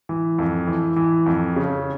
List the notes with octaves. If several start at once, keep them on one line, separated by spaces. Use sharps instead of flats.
E3
F2
E3
E3
F2
C#3